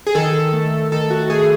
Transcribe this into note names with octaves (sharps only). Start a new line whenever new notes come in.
G#4
D#3 A4
A3
D#3 A4
F#4
A3 G#4